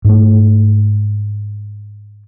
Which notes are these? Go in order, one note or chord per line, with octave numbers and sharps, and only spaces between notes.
G#2 A3